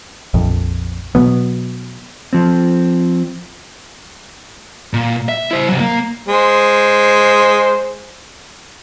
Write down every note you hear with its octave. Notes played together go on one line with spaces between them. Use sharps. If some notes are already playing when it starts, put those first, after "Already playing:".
A#1 F2
B2 F#3 B3
F3 C4
A#2
E5
E4 C5
C3 F#3
A#3
G#3 C5